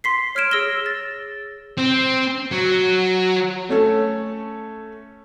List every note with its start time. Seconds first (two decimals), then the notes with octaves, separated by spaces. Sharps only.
0.04 C6 B6 C7
0.35 C#5 F6 G#6 D7 E7
0.51 G#4 E6 A#6 G7
0.85 A6 A#6
1.78 C4
2.52 F#3
3.69 A3 C#4 A4